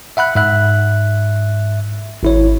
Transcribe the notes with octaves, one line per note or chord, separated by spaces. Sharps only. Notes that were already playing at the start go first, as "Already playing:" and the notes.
E5 F#5 B5 F#6
G#2 E5 F#6
G#1 E4 C#5